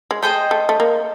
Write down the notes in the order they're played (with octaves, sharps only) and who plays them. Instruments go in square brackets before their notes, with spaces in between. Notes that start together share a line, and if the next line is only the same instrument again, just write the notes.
[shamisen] G#3
[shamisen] A3 [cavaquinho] G#4 C5 D#5 G5
[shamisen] A3
A3
A#3